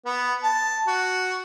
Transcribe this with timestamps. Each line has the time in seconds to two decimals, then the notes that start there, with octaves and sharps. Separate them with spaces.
0.05 B3
0.43 A5
0.87 F#4